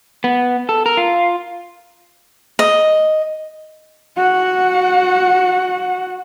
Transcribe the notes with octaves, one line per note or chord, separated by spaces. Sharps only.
B3
A4
A#4
F4
D#5
F#4 F#5